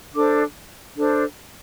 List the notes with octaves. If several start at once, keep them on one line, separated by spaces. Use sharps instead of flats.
D4 A4 C5 D6
D4 A4 C5